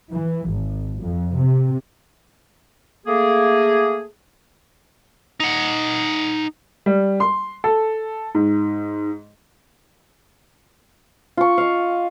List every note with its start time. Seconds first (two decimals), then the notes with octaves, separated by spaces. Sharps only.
0.11 E3
0.49 G#1
1.00 F2
1.35 C3
3.06 A3 A#3 G#4
5.40 D#4 F#5
6.86 G3
7.20 C6
7.64 A4
8.35 G#2
11.37 F4 C#6
11.58 D#5 F5